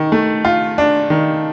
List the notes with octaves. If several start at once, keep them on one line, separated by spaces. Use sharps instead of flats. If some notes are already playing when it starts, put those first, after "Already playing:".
Already playing: D#3
A3
F4
D4
D#3